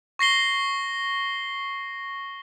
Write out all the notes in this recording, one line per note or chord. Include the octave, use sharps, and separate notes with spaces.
C#6 A#6 C7 G7